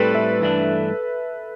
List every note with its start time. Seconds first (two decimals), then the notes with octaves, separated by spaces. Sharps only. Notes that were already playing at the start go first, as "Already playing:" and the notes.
Already playing: A2 G3 C4 A4 B4
0.15 E5
0.40 G2 E3 A3 D4